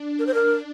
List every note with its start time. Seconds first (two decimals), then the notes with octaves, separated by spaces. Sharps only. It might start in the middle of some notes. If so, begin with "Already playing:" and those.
Already playing: D4
0.19 A#4
0.27 C5
0.34 A#4